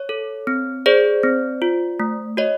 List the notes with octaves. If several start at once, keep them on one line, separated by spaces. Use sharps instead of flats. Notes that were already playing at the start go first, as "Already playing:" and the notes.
Already playing: C#5
A4
C4
G#4 C5 D5
C4
F4
A3
F#4 C#5 D#5